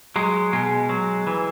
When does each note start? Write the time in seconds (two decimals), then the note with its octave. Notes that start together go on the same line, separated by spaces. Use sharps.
0.16 F#3 G#3
0.53 B2 G#3
0.89 F#3
1.27 E3